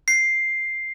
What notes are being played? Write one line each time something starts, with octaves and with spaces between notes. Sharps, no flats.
C7